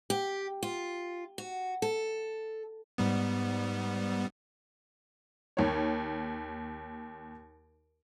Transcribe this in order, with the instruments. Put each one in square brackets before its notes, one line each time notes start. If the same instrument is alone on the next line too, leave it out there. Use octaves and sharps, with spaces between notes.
[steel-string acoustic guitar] G4
F4
F#4
A4
[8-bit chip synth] G#2 G3 B3
[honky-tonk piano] D#2 C#5